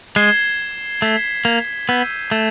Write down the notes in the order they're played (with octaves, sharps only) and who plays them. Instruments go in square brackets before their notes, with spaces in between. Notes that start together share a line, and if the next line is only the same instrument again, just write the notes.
[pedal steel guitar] G#3 [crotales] G#6 C7 E7 G7
[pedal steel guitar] A3 [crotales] G#6 B6 E7 G7
[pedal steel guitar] A#3
[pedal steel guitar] B3 [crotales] E6 G6 B6 D#7
[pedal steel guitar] A3